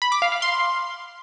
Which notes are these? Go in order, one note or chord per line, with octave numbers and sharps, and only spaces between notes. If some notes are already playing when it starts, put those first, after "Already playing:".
B5
D6
F5
F5
C6